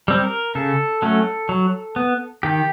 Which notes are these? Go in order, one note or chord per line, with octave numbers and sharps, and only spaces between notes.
G3 C4
A#4
C#3 A4
F#3 A3 C#4
F#3
B3
D#3 G4